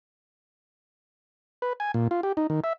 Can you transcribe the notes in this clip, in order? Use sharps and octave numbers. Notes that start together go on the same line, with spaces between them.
B4
G#5
A#2
F4
G4
D#4
D#3
E5